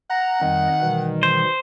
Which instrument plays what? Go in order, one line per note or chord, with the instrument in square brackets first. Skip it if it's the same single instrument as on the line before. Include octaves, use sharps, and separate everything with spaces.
[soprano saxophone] F#5 [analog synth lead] A#5
[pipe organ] F2 G3 D#5 [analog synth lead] D#3
[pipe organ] B2 E3 G3
[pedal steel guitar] C5